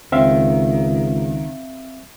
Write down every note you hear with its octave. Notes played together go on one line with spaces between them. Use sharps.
C#2 D#3 C4 E5 F5